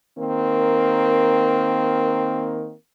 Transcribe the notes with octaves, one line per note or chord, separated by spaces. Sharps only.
D#3 A#3 C4 A#4